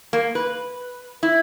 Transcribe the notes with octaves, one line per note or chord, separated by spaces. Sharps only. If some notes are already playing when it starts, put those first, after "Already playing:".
A#3
B4
E4